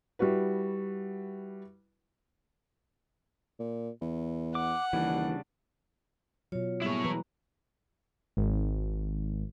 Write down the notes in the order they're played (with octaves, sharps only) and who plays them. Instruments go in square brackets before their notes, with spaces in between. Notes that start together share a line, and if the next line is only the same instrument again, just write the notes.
[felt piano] G3 E4 F#4 B4
[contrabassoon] A#2
E2
[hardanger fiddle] F#5 [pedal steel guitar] D6
[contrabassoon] D#2 [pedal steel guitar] C#3 G3 D4 [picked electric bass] E3
[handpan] B2 F#3 [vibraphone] F4 C#5
[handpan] G3 A#3 G#4 [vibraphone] B3 [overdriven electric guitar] E4 C#5
[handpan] E3 F#3 B4 [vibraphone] A#5
[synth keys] G#1